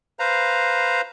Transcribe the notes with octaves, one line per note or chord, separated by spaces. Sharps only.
B4 C5 F5 A#5